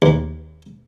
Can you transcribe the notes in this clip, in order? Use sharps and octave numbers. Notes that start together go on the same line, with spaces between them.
D#2